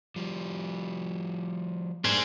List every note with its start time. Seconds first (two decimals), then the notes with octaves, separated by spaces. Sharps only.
0.16 F3 G3
2.05 G3 A#3 D4 G#4 C5